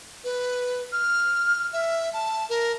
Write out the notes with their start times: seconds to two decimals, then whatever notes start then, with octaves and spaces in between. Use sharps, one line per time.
0.24 B4
0.92 F6
1.73 E5
2.13 A5
2.49 A#4